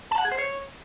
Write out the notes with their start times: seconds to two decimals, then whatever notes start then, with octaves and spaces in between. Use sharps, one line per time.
0.11 A5
0.18 F#5
0.25 G#4
0.32 C5
0.38 C#5